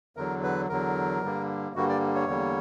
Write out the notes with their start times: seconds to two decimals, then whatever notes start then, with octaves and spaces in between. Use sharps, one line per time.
0.16 E2 D3 F#3 A#4
0.43 B4
0.69 E2 D3 F#3 A#4
1.22 G2 D3 G3 A#3
1.75 G2 D3 G3 A#3 F#4
1.89 D5
2.15 C#5
2.28 E2 D3 G3 A#3